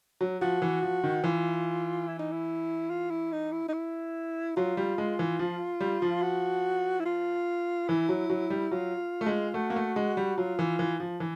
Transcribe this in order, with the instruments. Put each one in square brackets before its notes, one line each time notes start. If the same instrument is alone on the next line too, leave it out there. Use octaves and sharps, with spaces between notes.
[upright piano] F#3
[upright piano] F3 [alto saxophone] F#4
[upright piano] E3
F3
D#3
[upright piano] E3 [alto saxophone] F4
[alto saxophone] E4
D#4
E4
F4
E4
D#4
E4
D#4
E4
[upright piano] F#3 [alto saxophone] F4
[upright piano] G3
G#3
E3
F3
G3
F3
[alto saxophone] F#4
E4
F4
[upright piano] E3 [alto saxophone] E4
[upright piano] F#3
F#3
G3
[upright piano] F#3 [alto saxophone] F4
[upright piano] A3
G#3
[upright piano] A3 [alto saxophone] F#4
[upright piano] A#3
A3
G#3
G3
[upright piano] F#3 [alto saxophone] F4
[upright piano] E3
E3
F3
E3